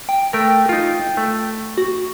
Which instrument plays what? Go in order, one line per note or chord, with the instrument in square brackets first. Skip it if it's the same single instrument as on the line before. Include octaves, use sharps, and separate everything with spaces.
[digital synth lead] G5
[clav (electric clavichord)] A3 A#4 [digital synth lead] G5
[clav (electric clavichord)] D#4 F4
A3
[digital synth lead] F#4